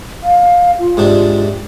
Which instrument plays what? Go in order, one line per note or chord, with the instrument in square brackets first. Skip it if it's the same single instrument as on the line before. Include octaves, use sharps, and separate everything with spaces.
[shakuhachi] F5
F4
[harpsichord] G#2 C3 D4